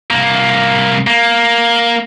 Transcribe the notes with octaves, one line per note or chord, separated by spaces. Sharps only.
C2 A#3
A#3